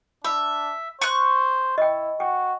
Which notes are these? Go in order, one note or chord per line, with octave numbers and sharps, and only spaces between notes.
D4 E5 B5
C5 C#6 F#6
E4 D#5 G5
F#4 G5